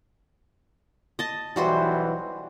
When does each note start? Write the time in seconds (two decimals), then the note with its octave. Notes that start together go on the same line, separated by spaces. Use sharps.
1.19 D#5 A5
1.56 B1 E3 G3 F#4 C5